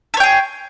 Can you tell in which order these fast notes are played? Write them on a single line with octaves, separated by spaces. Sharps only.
A4 C#5 G5 G#4